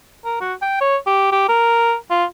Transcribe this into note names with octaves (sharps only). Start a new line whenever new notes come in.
A#4
F#4
G5
C#5
G4
G4
A#4
F4